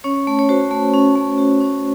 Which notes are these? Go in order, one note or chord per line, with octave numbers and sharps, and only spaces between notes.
C#4 C#5
A3
C#5
F#4 C5
A3
C#4
A3
F#4
C#4